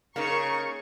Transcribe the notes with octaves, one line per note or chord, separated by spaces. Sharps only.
C#3 A#3 D#4 A#4 A#5 C#6